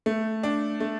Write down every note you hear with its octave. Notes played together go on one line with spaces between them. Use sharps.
A3
D4
A3